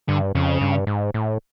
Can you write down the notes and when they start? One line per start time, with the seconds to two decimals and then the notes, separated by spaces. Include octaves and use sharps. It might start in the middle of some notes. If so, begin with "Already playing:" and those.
0.09 G2 D3
0.35 F2 C#3
0.61 G2
0.87 G#2
1.14 A2